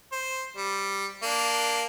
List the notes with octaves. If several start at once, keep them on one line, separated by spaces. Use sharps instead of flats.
C5
G3
A#3 D4